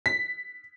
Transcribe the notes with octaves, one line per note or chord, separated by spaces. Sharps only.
B6